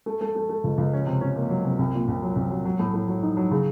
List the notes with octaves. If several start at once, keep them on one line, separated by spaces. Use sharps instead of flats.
A3
A3
A3
A3
C#2
C#2
C#4
C3
C#4
A#3
F#3
C3
C2
A#2
C2
F#3
C2
F#3
F#3
A2
A2
F#3
D#4
F#3
C#3